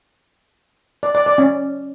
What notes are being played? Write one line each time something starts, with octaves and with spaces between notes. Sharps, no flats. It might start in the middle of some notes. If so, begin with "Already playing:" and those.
D5
D5
D5
C#4